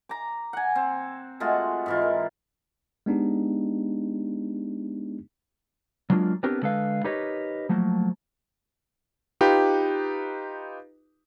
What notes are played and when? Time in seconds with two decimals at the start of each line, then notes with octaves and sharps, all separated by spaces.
0.09 A#5 D6
0.53 F#5 G#5
0.75 C4
1.40 G#3 A3 F4 F#4
1.86 G#2 E3 F4
2.02 A#4
3.06 G#3 B3 D4 D#4 G4
6.10 F#3 G#3 A#3 D4 F4
6.43 B3 C4 D4 G4 A#4
6.62 D3 G#3 A4 B4 F5
7.04 D#4 G4 A#4 B4 C#5 D#5
7.69 F3 F#3 A3 A#3
9.41 D#4 F4 G4 B4